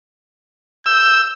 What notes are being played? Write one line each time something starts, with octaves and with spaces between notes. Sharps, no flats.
E6 G6